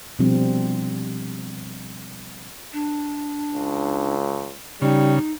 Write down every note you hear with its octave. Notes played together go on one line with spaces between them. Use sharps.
B2 F3 G3 C4 D4
D4
C#2
C#3 G3 D#4